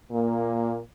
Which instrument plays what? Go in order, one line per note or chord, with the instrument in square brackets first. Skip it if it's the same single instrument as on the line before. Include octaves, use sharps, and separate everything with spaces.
[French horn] A#2 [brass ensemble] A#3